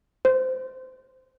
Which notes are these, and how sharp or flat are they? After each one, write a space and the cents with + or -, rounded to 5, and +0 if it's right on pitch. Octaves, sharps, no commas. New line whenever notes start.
C5 -15